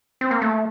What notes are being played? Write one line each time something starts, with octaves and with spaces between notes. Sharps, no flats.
C4
A#3
A3